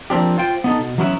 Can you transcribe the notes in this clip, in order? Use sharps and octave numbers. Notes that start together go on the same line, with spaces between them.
F3 A#3 C4 D4 G4
F4 C5 G5
B3 D#4 A4
B2
E3 F#3 B3 C#4 E4 F#4